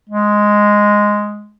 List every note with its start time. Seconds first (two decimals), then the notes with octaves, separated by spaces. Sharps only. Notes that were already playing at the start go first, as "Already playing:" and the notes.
0.09 G#3